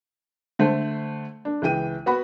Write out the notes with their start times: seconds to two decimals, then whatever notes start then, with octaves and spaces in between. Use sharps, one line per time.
0.59 D3 A3 C5
1.45 D4
1.62 C#2 E3 G5 D#7
2.06 B3 F#4 F#5 B5